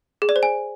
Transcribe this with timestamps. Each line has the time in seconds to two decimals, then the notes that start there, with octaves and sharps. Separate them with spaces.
0.22 G#4
0.29 D5
0.36 C5
0.43 G#5